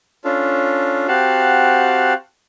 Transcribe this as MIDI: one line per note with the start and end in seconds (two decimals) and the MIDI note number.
0.25 1.07 61
0.25 1.07 62
0.25 1.07 65
0.25 1.07 69
1.08 2.13 60
1.08 2.13 66
1.08 2.13 67
1.08 2.13 77
1.08 2.13 78
1.08 2.13 81